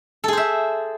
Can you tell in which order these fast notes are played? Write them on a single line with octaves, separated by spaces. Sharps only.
A4 G#4 C5 E5